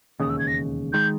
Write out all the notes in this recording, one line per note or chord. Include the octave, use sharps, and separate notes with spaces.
E1 D#2 C#3 D#6
E6
G#6
A#6
D#3 G#3 G6